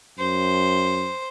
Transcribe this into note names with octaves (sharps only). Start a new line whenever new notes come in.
F#2 C5